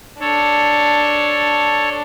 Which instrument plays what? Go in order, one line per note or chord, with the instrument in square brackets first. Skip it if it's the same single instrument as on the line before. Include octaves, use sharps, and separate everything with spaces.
[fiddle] D4 [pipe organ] A4 C#5